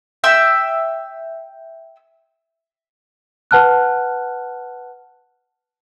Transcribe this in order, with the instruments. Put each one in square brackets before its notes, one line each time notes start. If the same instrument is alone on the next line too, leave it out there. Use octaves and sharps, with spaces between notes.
[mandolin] E5 G5 E6
[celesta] B4 F#5 A5 F6 F#6